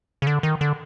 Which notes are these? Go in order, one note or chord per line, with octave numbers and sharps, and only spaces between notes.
C#3
D3
D#3
D3